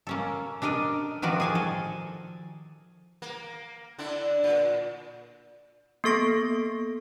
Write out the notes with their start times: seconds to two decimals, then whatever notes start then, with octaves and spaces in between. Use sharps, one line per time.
0.07 A#3 C#4 A4
0.62 D4 A4 A#4 D5 D#5
1.22 D#3 F3 F#4 A#4 D5
1.40 G#4 G#5 A5
1.55 A4
3.22 A#3
3.99 D3 D4 E4
4.44 A#2
6.04 A#3 B3 A4 C#6 A#6 D7